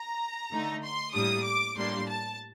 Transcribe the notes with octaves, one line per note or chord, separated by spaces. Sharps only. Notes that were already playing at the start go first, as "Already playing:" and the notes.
Already playing: A#5
D3 A3 D#4
C6
A2 G3 A#3 D4 D#6
D6
A2 G3 A#3 D4 C6
A5